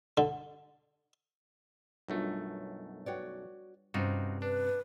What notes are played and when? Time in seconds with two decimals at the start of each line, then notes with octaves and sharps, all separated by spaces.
0.17 D3
2.08 B1 F#2 G3 A3 D4 F4
3.06 F#4 B4 C#5 D5 F#5 G5
3.94 G2 C3 C#4 D#4 F4 F#4 C5
4.42 D4 B4